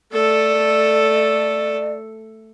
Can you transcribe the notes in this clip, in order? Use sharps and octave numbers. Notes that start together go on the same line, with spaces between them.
A3 A4 D5